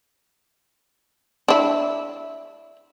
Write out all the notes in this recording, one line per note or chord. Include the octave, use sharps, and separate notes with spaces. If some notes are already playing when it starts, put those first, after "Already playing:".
D4 E4